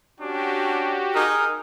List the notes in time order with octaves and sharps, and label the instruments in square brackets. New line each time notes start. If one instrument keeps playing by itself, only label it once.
[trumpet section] C#4 D4 [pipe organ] F#4 G4
[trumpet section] D#4 [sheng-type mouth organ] G#4 A#4 D#6 [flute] F6